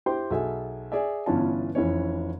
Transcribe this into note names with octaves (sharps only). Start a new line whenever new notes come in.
E4 G4 C5 G5 C6
B1 G#4 A4 E5 G#5
G#4 D5 E5
G1 E3 B3 C#4 F4 A5
F1 E3 C#4 C#5